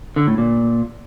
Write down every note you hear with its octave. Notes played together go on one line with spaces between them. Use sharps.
D3
A2
A#2